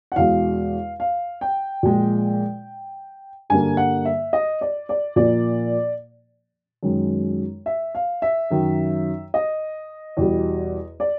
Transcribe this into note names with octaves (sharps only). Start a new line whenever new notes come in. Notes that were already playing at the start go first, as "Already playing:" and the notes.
F#5
E2 B2 G#3 F5
F5
G5
A#2 F3 G#3
G2 D3 G3 A#3 G#5
F#5
E5
D#5
D5
D5
A#2 F3 A#3 D5
F#2 D#3 G#3
E5
F5
E5
F#2 D#3 F#3
D#5
E2 B2 G3
D5